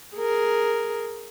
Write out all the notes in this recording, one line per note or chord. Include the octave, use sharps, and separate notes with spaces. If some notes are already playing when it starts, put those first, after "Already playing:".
G#4 A#4